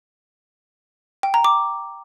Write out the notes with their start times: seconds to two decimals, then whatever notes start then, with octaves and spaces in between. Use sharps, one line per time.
1.23 G5
1.34 A#5
1.45 D6